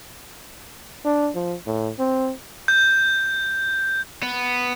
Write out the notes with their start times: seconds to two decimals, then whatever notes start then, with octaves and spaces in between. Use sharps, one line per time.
1.05 D4
1.35 F3
1.66 A2
1.99 C4
2.68 G6
4.23 B3